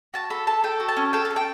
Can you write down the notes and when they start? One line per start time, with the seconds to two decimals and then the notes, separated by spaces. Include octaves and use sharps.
0.14 F#4 A5
0.30 A4 B5
0.47 A4 A5
0.64 A4 G5
0.80 F#4
0.88 A5
0.97 C#4
1.13 A4 G5
1.25 A5
1.30 A4
1.36 G5